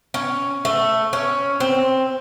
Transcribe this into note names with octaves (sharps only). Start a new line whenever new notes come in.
C#4
A3
C#4
C4